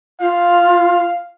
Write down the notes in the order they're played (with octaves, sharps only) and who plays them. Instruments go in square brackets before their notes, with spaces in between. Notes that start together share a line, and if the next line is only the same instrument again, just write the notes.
[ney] F4 [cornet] F5